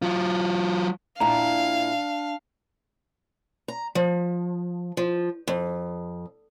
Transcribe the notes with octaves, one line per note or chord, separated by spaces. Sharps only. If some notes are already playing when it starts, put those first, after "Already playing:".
F#3 F4
A#2 D4 E4 F5 G5 A#5
A#5
F3
F3
F2